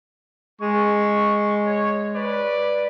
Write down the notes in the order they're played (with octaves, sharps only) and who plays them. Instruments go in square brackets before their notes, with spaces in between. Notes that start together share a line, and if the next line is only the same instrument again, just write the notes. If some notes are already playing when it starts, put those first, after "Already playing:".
[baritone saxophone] G#3 [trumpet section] C#6
[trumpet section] C#5
B4 D5